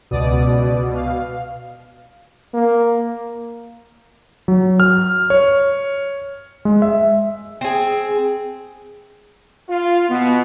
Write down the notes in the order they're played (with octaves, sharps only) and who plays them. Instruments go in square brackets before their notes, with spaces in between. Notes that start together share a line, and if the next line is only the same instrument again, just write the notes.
[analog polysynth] C#2 D5 D#6 [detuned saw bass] B2
[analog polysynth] F5
[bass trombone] A#3
[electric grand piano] F#3
F6
C#5
G#3
E5
[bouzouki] C4 G#4
[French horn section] F4
[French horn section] B2 [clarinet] B3